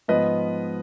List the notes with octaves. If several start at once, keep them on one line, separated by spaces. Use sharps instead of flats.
G#2 F3 B3 B4 D#5